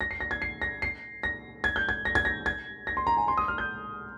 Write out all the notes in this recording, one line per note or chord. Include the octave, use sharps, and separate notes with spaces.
A#6
C7
A#6
G#6
C7
A#6
C7
A#6
G#6
G6
G#6
A#6
G#6
A#6
G#6
A#6
C6
A#5
G#5
C6
D#6
F6
G6